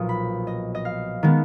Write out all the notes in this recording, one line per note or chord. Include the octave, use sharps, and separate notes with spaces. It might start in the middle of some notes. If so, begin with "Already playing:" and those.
Already playing: B1 A#2 F3 D#6
B5
D#5
D#5
F5
D#3 G#3 B3